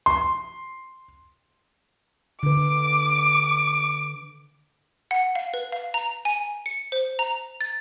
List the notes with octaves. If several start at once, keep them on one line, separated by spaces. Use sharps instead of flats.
C6
D3 B4 D6
F#5
F5
B4
F5
A#5
G#5
C#7
C5
A#5
A6